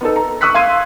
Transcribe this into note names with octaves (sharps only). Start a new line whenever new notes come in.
B3 D#4 A4
A#5
C#6 D#6 E6 F#6 B6
F5 C6 G#6 D#7